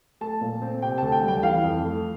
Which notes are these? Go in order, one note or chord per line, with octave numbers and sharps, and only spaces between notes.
A3 A5
A#2
C4
C3 G5
D2 A5
G5
G3
G5
E3 F5
F2
A3